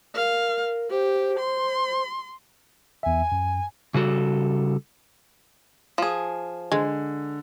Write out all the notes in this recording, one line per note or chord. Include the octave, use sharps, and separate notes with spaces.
A#4 F5
G4 C5
C6
E2 E5 G#5
F#2
C#3 G3 F#4 A4
F3 G#4
D3 G#3